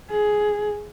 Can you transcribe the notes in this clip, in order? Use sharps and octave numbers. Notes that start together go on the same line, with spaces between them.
G#4